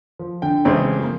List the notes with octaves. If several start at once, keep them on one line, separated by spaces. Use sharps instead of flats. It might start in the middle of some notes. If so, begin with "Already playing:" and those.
F3
D3 G5
A1 C#3 G#3 A3 C4
F3 A#3